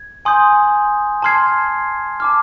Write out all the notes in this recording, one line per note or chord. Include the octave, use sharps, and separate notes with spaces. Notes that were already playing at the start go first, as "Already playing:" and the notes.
Already playing: G#6
G#5 C6 D#6 G6
A5 C6 F6 G#6 C7
A5 D6 F6